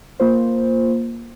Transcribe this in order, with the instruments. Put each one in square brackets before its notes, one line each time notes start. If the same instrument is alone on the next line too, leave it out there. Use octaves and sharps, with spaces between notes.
[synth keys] A#3 F4 C5